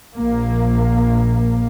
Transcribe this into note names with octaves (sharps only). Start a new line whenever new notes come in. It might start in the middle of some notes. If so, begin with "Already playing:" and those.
A#1 A#3